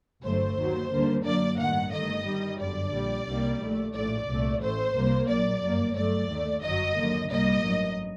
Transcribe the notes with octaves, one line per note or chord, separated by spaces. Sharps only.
G1 G2 F#3 A3 C5
D#2 D#3 F#3
D#2 D3 G3 A#3
F#2 F#3 A#3 D5
A1 G2 D#3 F#5
G1 G2 D#3 A3 D#5
G2 D#3 G3
G1 F#2 D3 D5
A#1 A#2 G3
C2 C3 D#3 G3 A#3
A#1 A#2 A3
A#1 A2 A3 D5
C2 A#2 A3
A1 A2 A3 C5
C2 C3 G3 A#3
A#1 A#2 F#3 D5
G1 F#2 F#3 A#3
G2 F#3 A3 D5
D#2 D#3 A3
G1 F#2 F#3 D#5
D#2 D3 F#3 A#3
C2 A#2 G3 A#3 D#5
A1 G2 F#3